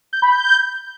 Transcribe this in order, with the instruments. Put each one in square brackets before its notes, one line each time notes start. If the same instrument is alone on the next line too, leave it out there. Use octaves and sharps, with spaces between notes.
[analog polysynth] G6
B5
G6